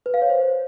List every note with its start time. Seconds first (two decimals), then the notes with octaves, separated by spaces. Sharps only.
0.06 B4
0.14 F5
0.22 C#5
0.30 C5